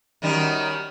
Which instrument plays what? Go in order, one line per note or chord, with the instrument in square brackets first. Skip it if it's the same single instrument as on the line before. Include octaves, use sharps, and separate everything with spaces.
[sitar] F#2 D#3 G3